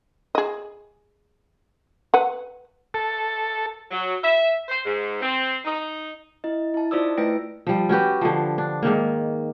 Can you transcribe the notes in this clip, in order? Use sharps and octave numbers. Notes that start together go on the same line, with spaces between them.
G#4 D#5
B4 F#5
A4
F#3
E5
C5
G#2
C4
D#4
E4 D#5
E4 A5
D#4 F4 C5 D5 D#6 E6
A3 E4 B4 G5 A#6 D7
F3 G3
C#4 F#4 G4 B4
D3 F3
D4
G#2 D#3 A#3